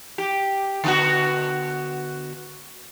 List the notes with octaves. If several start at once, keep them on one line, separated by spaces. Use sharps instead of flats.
G4
D3 B3 F#4